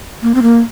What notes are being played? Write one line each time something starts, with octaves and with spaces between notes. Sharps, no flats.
A#3
C4
A#3